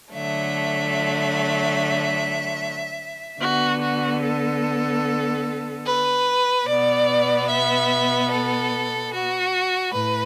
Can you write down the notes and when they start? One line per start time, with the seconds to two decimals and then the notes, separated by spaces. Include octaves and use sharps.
0.13 D3 F#3 A3 E5
3.41 D3 B3 F#4
3.80 F#4
4.22 A4
5.85 B4
6.66 B2 B3 D5
7.49 E5
8.30 A4
9.12 F#4
9.93 A2 B4